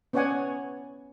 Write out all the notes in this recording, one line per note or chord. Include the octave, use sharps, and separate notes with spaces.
B3 C#4 C#5 D5 F#5 G#5